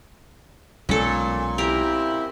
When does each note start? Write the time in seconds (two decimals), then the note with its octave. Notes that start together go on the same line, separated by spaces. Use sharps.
0.89 B1 A#2 G#3 C#4 A4
1.58 C4 E4 G4 A#4